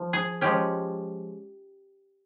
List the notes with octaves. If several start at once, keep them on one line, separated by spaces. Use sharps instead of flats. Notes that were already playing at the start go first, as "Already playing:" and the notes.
Already playing: F3
G#4
F3 G#3 C#4 G4